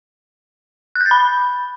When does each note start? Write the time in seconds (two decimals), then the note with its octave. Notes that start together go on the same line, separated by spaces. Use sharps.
0.95 F#6
1.01 G6
1.06 A6
1.11 B5